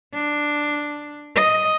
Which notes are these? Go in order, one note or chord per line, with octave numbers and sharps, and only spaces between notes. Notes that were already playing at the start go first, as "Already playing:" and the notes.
D4
D#5